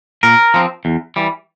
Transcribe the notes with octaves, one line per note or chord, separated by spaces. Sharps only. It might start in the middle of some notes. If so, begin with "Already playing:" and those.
A#2 A#4
F3 C4
E2
E3 G3